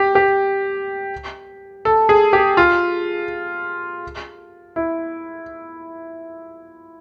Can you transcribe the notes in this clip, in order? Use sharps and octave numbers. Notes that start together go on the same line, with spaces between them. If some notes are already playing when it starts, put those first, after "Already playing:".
Already playing: G4
G4
A4
G#4
G4
F4
E4